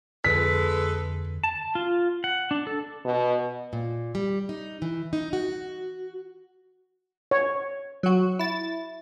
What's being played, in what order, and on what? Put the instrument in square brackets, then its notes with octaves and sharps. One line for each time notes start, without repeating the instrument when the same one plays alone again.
[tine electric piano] F2 D3 [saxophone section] G#3 A4 B4 [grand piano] B6
[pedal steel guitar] A5
F4
F#5
D4
A4
[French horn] B2
[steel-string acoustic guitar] A#2
G3
D#4
E3
D#4
F#4
[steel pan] C#5
[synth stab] F#3 F#4
E4 A6